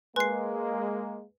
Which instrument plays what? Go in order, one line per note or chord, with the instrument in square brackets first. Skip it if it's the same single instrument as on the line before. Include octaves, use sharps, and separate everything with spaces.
[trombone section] G#3 A#3 [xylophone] B4 C7 [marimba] G#5 C6 F#6